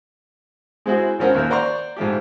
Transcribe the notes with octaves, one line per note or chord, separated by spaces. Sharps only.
G#3 C4 E4 F#4 G#4
G#1 F3 C4 C#4 A#4 F#5
D#2 A#3 A#4 E5
C5 D5 F#5 A#5 C#6
G#2 F3 A3 G4